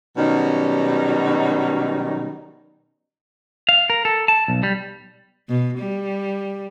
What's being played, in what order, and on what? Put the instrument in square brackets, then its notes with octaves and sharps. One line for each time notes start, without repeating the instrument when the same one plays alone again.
[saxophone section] B2 D#3 F#3 G3 C#4 D#4
[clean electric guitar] F5
A#4
A4
A5
B1
G3
[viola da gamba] B2
G3